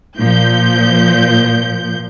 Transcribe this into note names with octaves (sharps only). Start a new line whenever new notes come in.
A#2 F3 G6